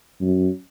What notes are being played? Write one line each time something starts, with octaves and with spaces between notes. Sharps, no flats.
F#2